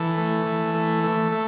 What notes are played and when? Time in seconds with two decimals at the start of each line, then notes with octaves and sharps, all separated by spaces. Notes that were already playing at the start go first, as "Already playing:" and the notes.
Already playing: E3 A4
0.18 A3
0.46 E3
0.75 A3
1.04 A3
1.32 A3